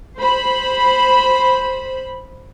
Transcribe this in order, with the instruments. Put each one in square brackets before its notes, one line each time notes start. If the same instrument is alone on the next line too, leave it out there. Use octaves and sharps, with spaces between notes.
[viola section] C5 B5